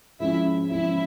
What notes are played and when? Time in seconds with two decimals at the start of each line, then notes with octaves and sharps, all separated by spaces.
0.20 F3 G#3 C#4 E4 E5
0.71 F3 G#3 C#4 E4 E5